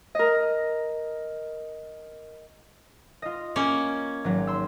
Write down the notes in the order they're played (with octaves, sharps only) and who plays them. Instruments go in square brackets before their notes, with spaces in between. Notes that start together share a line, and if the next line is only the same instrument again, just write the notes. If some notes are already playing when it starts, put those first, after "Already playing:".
[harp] A#4 D#5
F4 D#5
[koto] A#3 C#4
[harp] G#1 F#3
C6 E6